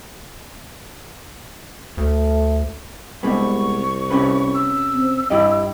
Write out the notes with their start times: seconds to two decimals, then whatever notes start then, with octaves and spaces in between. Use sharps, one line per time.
1.97 D2 A3
3.23 C2 C3 G#3 B3 C#6
4.10 C3 C#4 B4
4.55 E6
4.95 C4
5.30 G2 E4 G4 D#5